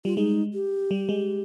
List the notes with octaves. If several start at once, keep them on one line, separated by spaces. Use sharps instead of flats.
G3 F4
G#3 D#4
G4
G3
G#3